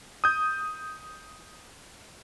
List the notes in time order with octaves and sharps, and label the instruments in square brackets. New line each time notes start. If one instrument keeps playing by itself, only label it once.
[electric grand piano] D#6 G6